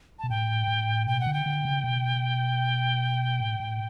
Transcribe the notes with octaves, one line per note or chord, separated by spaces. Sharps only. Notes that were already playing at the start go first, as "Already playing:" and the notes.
B2 A5
A2 G5
A2
B2 G5
F#5
D3
G5
D3
C#3
B2
A2
A2